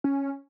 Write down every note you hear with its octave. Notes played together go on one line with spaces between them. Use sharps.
C#4